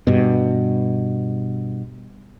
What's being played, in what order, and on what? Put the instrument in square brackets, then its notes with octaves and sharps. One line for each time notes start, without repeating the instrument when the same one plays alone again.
[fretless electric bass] G2 B2